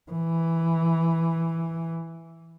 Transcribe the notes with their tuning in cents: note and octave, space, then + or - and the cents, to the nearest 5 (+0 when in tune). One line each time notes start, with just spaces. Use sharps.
E3 +0